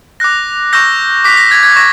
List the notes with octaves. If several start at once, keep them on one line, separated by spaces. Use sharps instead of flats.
D6 F#6 A#6
C#6 E6 G6 A#6
D6 F#6 B6
A#6
G#6
G#6
C#6 A#6